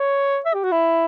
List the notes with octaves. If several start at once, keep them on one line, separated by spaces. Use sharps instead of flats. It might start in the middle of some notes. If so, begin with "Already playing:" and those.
Already playing: C#5
E5
G4
F#4
E4